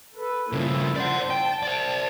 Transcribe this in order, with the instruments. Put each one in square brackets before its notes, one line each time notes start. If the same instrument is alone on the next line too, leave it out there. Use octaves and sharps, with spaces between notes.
[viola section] A4 B4
[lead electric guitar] G2 C#3 [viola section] F3 A#3 E4
[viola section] C5 [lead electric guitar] D5 F#5
[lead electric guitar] G5 [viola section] A5
[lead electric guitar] C5 D5